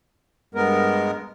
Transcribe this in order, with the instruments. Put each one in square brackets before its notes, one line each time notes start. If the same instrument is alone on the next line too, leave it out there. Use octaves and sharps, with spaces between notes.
[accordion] G2 G#3 B3 A#4